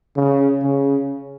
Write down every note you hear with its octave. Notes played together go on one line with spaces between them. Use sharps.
C#3
C#3